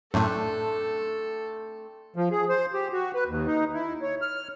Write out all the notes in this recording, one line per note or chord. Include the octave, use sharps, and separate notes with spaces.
F#2 A2 A3 C4 D4 A4
F3
G#4
C5
G4
F#4
B4
D#2
D#4
E4
C#5
F6